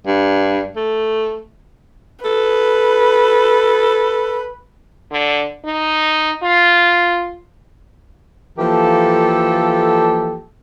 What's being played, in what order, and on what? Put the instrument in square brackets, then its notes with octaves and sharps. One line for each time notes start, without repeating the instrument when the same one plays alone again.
[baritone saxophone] G2
A3
[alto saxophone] A4 [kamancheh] B4
[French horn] D3
D#4
F4
[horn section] E3 F3 A#3 G4 A4